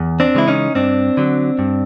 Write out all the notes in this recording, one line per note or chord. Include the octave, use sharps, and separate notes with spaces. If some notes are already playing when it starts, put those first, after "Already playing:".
Already playing: E2
C4 D4
C#3 E3 G#3 E4
C#4 D#4
G2 C4 D4
D3 F#3
G2